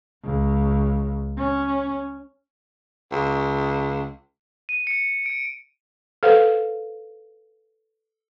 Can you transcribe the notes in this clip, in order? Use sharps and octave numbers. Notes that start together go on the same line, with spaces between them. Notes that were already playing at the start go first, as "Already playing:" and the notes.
C#2
C#4
C#2
D#7
C#7
D7
A4 B4 C5 F5 F#5